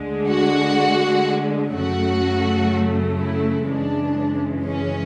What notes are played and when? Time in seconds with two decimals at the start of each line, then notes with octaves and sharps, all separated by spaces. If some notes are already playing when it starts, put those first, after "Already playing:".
Already playing: D2 D3 G#3
0.28 F#4
1.74 F#2 C#3 F#3 A3 F#4
3.20 E4
3.69 F#2 C#3 E3 G#3 D4
4.66 C#4